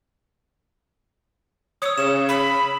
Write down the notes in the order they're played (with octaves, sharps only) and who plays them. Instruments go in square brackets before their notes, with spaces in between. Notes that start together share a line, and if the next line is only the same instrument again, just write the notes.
[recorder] C#5 [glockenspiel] D#6 E6
[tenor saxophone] C#3 [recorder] C#5 [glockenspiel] E7
[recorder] B5